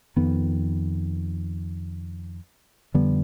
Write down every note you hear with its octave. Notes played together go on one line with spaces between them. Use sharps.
F2 D#3 B3
F2 D3 G3 B3